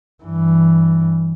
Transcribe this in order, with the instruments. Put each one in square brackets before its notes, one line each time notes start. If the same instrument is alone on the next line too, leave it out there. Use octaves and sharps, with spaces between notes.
[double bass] G2 E3